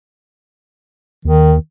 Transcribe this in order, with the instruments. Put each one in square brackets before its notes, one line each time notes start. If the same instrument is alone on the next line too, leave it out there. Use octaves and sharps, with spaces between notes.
[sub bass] D#2 [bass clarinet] D#3